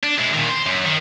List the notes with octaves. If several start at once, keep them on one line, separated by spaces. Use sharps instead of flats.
D4
G#3 E4
A#2 D#3
C5
F#2
D#3